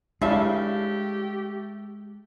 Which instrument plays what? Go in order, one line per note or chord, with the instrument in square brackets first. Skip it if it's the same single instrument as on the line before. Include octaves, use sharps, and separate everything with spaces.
[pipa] C#3 A3 E5 [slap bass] G#3 [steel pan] D4 E4 F5 [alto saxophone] G4